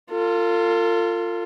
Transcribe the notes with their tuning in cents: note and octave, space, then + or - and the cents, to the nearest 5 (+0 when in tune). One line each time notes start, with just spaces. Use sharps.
F4 +0 A4 +45